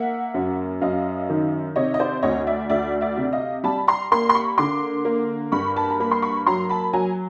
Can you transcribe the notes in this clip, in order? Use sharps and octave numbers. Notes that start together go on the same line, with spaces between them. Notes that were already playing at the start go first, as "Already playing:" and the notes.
Already playing: A#3 E5 F#5
F#2
F#2 D#5 F5
D#3
C3 C#5 D#5
D#5
C5 D5
D2 C#5 D#5
D5 E5
D2 D5 E5
D5 E5
C3
D#5 F5
G3 A5 B5
A#5 C6
A#3 A#5 C6
C6
B5 C#6
D3 C6 D6
A#3
G2 B5 C#6
A5 B5
A#5
A#3 B5
C6
B5 C#6
F#3 A#5 C6
A5 B5
F#3 G#5 A#5